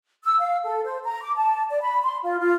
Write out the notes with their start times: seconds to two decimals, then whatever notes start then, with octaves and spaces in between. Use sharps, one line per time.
0.24 E6
0.40 F5
0.65 A4
0.85 C5
1.04 A#5
1.23 D6
1.37 A5
1.70 D5
1.82 B5
2.04 C6
2.23 F4
2.40 F4